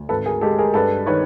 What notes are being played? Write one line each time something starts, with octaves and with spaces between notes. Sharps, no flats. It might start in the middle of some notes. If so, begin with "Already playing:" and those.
Already playing: D2
G#1 A4 B4
G#4 A#4
G#3 G4 A4
G#4 A#4
G2 A4 B4
D#3 B4 C#5